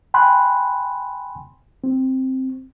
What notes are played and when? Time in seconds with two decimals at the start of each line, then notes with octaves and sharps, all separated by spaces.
0.14 G5 G#5 B5 C6 F#6
1.84 C4